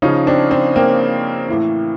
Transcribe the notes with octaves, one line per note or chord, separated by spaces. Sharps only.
C#3 F3 C#4 D#4
C4 D4
C4 D4
A#3 C4
A2 E3